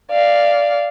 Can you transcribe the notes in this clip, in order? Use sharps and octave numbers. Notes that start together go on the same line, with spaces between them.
D5 F5